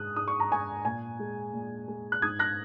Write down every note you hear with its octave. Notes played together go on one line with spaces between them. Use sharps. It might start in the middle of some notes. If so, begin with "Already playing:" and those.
Already playing: G#2 G#3 D#6 F#6
G#2 D#6
C#6
A#5
G#3 G#5 C#6
A#2 G#5
G#3
A#2
G#3
F#6
G#2 D#6 G#6
F#6 A#6